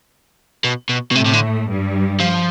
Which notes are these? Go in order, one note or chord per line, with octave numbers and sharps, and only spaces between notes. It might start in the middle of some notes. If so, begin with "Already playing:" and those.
B2
B2
B2
A2 C3 A3
C3
D3
G2 G3
F3